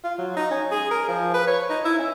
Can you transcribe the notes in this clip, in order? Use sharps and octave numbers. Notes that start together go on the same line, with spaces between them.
F4
F#3
D#4
C#4
G#4
A#4
F3
B4
C#5
D#4
E4
C#4